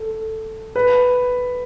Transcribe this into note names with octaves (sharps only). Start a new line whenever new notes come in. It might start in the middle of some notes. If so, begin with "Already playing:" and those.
Already playing: A4
B4